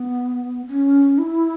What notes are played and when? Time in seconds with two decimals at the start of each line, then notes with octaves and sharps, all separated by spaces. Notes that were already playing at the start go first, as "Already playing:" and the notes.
Already playing: B3
0.67 C#4
1.18 E4